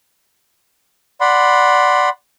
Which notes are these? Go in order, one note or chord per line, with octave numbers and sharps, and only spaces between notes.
D5 F#5 B5 C6